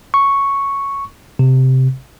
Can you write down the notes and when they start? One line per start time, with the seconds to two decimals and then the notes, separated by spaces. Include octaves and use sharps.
0.14 C#6
1.39 C3